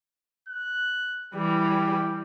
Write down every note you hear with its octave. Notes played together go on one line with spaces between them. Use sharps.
F#6
E3 G3 G4